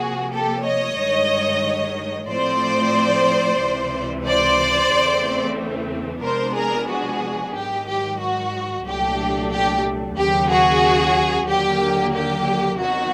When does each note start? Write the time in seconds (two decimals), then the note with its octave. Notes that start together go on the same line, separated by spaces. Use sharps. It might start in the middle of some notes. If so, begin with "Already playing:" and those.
Already playing: C3 F3 A#3 F#4 G#4
0.32 G4 A4
0.64 C#5 D#5
0.97 G2 D#3 G#3
2.28 A2 F3 A3 C4 C5 D5
3.60 C#2 C3 E3
4.25 C5 D5
4.91 E2 C#3 E3 A3 C4
6.22 C3 F3 G#3 B3 D4 A#4 C5
6.55 G#4 A#4
6.88 F#4 G#4
7.53 G#2 D#3 F#3 G4
7.86 G4
8.19 F#4
8.85 C2 A#2 F#3 A3 D4 G4
9.50 G4
10.16 D#2 C#3 F#3 G4
10.49 F#4 G#4
11.47 D#2 D3 F#3 A#3 G4
12.13 G4
12.78 C3 D#3 F#3 B3 F#4